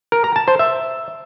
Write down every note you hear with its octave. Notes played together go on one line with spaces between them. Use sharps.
A#4
A#5
A5
C5
E5